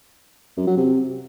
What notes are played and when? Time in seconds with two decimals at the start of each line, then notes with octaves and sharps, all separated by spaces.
0.57 F#2
0.67 F#3
0.77 C3